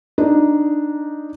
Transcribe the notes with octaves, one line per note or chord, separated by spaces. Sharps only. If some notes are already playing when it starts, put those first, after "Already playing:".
D4 D#4